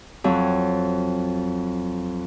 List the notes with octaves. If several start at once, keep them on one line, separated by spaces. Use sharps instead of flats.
F2 F#3